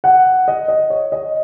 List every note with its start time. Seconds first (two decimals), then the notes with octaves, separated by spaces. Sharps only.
0.04 F#5
0.48 D#5
0.68 D#5
0.90 C#5
1.12 D#5